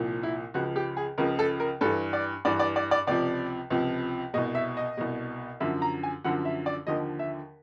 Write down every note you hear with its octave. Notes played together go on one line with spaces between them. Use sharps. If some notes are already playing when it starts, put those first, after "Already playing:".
Already playing: C2 A#2 F3
E4
C#2 C#3 F3 F#4
G4
G#4
C#2 C#3 F3 A#4
A4
A#4
G2 E3 A4
D5
G2 E3 D5
D5
D5
D5
C#2 C3 F3 D5
C#2 C3 F3
C2 B2 D#5
E5
D#5
C2 B2
F#2 D3 F3 E5
A#5
G#5
F#2 D3 F3 F#5
E5
D5
D#2 D3 F3 D#5
E5